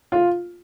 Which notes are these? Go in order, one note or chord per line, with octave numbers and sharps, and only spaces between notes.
F4